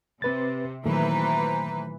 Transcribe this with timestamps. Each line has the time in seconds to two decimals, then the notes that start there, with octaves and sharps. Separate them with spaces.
0.22 C3 C4 B4 A6
0.86 A#2 D#3 E3 F#3 A3 B4 C5 A#5